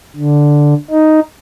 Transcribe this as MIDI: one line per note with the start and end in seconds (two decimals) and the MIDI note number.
0.16 0.74 50
0.91 1.20 63